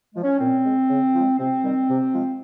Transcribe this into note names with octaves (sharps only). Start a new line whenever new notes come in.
F3 G#3
C#4
A#2 C4
G#3
C#3
F3 G#3
C3 C4
D#3 G3
C3
F3 G#3